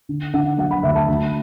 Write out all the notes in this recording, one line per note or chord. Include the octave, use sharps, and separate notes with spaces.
D3
D3 F#5
F#3 F#5
B5
D2 E5
A5
D2 B5